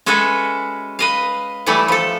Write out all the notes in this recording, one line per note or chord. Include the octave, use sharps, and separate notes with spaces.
G#3 C#4 F#4 A4 B4 E5
B4 D#5 F5
E3 F#3 G3 A3 E4
F3 A4